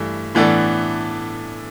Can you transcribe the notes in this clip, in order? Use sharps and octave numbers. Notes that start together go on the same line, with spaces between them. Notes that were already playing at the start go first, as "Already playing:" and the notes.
Already playing: G2 E3 A3
A2 E3 B3 D4 A4